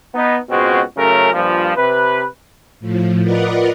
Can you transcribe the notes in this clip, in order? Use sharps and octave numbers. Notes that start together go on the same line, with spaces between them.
B3 D#4
C#2 B2 G#3 C4 F#4
F#2 C#3 A3 C#4 A#4
G2 A#2 F3
C3 B4
A2 F3
F4 A#4 B4 D5 D#5 F#5